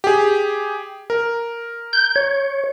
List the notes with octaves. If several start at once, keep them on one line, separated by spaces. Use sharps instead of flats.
G4 G#4
A#4
G6
C#5